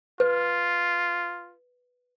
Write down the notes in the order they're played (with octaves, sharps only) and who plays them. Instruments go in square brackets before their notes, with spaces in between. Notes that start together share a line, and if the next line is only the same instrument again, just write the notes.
[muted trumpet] F4 [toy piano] B4